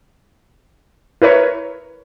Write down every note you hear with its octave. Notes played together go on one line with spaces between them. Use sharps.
E4 A#4 B4 C#5